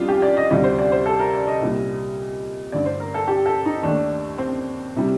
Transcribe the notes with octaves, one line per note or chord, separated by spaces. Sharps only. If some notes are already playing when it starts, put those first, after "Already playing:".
Already playing: F2 G3 D4 F4
G4
D5
D#5
D2 C3 G3 D5
C5
D5
C5
A4
A#4
D5
D#5
C2 A#2 G3
G2 D3 A3 D5
C5
A#4
A4
G4
A4
D#4
D#2 D#3 A3 D4
C4
C3 G3